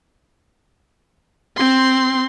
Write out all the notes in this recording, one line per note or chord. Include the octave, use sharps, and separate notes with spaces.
C4 C6